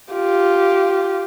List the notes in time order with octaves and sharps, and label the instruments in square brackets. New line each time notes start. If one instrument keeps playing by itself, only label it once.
[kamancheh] F4 G4